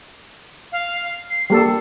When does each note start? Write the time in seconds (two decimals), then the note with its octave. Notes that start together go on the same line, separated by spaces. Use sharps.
0.72 F5
1.30 C7
1.50 G3 A#3 A4